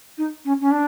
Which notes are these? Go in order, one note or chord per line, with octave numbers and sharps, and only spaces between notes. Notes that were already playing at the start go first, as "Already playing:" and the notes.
D#4
C#4
C#4
D4